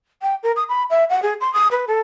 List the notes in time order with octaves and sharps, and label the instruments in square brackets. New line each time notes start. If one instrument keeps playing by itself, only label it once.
[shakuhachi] G5
A#4
D#6
B5
E5
F#5
G#4
C6
D#6
B4
A4